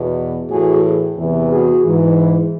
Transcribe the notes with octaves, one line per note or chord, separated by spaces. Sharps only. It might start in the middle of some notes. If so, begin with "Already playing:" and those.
Already playing: E2 B2
A2 E3 F#4 G#4
E2 C3 E3
F#4 G#4
G#2 E3